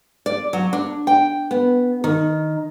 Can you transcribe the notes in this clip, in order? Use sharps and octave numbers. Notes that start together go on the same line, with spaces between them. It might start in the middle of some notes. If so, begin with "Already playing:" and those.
D5
F#3
D4
G5
B3
D#3